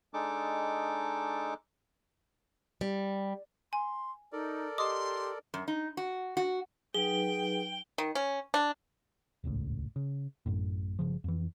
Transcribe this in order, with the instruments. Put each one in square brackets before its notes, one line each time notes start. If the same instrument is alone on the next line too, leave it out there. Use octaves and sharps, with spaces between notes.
[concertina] G#3 D4 D#4 A4 D6
[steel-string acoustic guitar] G3
[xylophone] G#5 [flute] C6
[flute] D#4 [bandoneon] A4 A#4 D5
[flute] G4 [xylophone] D#5 D6 D#6 [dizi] C6
[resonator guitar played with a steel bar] F#2
D#4
F#4
F#4
[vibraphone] F#3 D#4 B4 [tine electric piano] G#4 [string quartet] G5 [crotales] G7
[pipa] D#3
C#4
D4
[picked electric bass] D#1 G#1 C#2 A2
C#3
A1 F#2 A2
G1 C2 C#3 F3
F2 E3